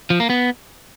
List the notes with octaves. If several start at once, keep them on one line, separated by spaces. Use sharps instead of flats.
F3
A#3
B3